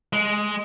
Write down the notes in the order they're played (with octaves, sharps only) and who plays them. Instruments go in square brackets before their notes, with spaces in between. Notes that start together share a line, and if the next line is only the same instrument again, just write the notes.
[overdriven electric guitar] G#3